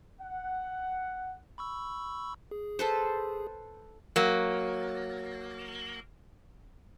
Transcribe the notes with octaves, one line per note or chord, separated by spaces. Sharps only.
F#5
B5 C#6 E6
G#4
A4 B4 C5
F#3 A#3